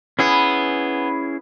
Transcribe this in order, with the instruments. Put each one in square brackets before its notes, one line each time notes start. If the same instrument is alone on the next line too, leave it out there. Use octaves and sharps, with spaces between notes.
[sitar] B3 [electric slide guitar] C#4 E4 G#4